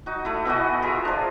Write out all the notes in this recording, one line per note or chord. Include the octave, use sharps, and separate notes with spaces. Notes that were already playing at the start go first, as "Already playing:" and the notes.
D#4 F#4
A3 E4
B2 E3 F#4 D#5
F4 G#4 A#4 E5
F3 D4